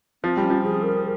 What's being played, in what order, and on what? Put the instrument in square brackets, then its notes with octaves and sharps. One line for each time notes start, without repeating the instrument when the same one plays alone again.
[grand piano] F3 [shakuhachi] C4
[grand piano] G3
[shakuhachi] C#4
[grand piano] F3
[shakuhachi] G#4
A#4